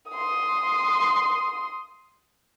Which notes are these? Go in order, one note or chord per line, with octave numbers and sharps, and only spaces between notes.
C6 D#6